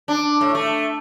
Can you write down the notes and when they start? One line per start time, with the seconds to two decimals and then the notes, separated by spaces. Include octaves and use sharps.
0.08 D4
0.41 A2
0.55 A3